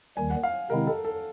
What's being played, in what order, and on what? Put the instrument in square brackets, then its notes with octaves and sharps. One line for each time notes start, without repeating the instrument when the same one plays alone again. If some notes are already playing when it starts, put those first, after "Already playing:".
[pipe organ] D#2 D#3 G3 [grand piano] G#5
[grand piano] F#5
F5
[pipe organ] C3 D#3 G#3 C4 E4 [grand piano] A#4
[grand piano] A4
A4